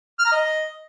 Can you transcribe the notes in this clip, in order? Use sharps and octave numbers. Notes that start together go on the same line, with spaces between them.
F6
A#5
D#5